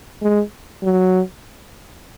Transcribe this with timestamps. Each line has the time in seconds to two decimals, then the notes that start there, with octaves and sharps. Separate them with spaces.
0.22 G#3
0.83 F#3